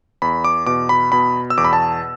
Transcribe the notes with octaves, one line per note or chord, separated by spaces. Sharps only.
E2 B5
D6
B2 D6
B5
B2 B5
E6
E2 D6
B5
A5